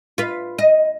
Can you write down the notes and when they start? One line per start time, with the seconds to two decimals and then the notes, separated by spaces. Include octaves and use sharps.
0.18 F4 B4
0.58 D#5